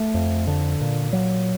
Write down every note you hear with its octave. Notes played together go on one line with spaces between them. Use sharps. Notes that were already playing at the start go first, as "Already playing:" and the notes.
Already playing: A3
F2
D3
A#2
F#3